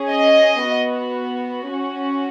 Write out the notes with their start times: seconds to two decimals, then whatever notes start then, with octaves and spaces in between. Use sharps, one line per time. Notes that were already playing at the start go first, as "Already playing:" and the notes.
Already playing: C#4 G#4
0.11 D#5
0.64 B3 F#4
1.70 C#4 F#4